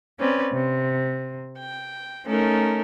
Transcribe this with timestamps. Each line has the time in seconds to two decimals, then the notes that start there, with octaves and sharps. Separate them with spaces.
0.19 C4 C#4 B4 D5
0.53 C3
1.58 G5
2.26 A3 C#4 D#4 A4 A#4